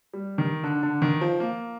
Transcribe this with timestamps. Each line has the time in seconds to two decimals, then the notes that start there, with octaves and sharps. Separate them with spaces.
0.13 G3
0.38 D#3
0.64 D3
0.83 D3
1.02 D#3
1.21 F3
1.40 A#3